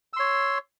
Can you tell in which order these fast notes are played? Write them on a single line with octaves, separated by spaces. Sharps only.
E6 C6 C#5